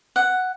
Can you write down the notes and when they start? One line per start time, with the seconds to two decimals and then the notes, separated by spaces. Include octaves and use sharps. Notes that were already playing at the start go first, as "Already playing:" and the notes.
0.16 F#5